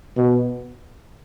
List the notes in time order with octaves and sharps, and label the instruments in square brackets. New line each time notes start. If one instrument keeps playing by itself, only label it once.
[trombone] B2